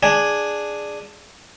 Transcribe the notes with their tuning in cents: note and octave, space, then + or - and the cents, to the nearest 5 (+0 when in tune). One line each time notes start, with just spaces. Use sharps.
D4 +5 G#4 +0 G#5 +0